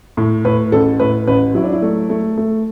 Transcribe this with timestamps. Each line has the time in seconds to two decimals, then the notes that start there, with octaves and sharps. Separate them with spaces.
0.17 A2
0.45 A2 B4
0.72 A1 A4
1.00 A2 B4
1.27 A1 B4
1.55 F#3 E4
1.64 D4
1.73 E4
1.82 A3
2.10 A3
2.37 A3